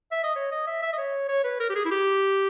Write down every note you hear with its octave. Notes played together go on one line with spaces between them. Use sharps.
E5
D#5
C#5
D#5
E5
E5
D#5
C#5
C#5
B4
A#4
G4
G#4
E4
G4